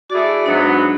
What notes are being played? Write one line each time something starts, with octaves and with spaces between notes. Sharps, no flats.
A3 E4 F#4 G#4 D5
G#2 F#3 B3 D4